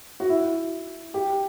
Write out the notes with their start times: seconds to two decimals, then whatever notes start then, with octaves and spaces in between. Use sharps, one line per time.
0.20 F#4
0.29 E4
1.14 G4